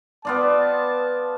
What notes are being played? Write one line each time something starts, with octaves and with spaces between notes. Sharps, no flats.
B3 F4 D5 A5